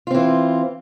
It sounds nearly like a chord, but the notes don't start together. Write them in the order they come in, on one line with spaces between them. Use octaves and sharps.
F4 C4 E3